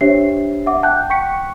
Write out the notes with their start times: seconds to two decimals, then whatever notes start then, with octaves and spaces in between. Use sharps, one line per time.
0.01 D4 G4 C5 C#5 E5 C7
0.66 E5 F#5 D6
0.83 F#5 G5 A5 F#6 G6
1.10 G5 C#6 B6 C#7